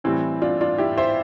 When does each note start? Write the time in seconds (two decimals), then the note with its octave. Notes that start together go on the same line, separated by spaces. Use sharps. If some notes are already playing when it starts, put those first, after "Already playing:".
0.04 A2 E3 G3 C4
0.42 D4 F4
0.61 D4 F4
0.78 E4 G4
0.97 C5 E5